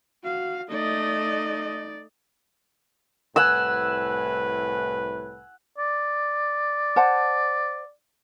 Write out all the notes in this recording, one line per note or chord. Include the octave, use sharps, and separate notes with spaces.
F#4 F5
A3 D#4 D5 D#5
C2 A2 B4 F#5 G#5 E6
D5
C5 F#5 A5